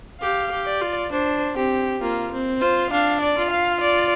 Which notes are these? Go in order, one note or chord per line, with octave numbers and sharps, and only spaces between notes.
G4 F5
G4
D5
F4
D4 C5
C4 G4
A#3 F4
C4
F4 C5
D4 F5
D5
F4
F5
D5